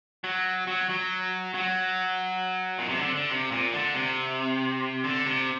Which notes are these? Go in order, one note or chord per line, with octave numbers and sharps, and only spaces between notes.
F#3
F#3
F#3
F#3
A#2
C3
D3
D3
C3
A#2
D3
C3
D3
C3